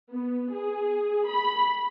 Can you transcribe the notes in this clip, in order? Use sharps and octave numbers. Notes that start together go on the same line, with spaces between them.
B3
G#4
B5